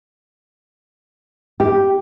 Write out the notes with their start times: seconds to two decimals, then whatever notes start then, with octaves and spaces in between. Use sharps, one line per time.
1.60 G4